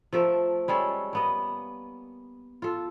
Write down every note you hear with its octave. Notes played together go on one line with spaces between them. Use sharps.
F3 A3 A4 A#4
G3 G#3 C#4 A4
A#3 B3 D#5
F4 A4